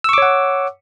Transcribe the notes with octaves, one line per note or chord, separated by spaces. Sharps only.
C#5 F#5 C#6 D6 E6